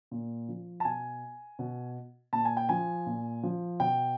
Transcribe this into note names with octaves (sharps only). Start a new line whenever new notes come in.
A#2
F3
A5
B2 G#5
B2
A#2 A5
G#5
G5
F3 G#5
A#2
F3
B2 G5